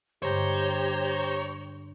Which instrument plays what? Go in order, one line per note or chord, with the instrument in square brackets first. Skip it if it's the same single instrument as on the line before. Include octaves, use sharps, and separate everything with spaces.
[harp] G2 D3 G#3 [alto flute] G4 [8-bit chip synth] C5 A#5 G6 [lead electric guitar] C#5